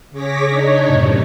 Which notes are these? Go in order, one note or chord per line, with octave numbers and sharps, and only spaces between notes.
C#3 G#4 C#5 D6 A#6 B6
D4 D#4 C#5
F#2 A2 C3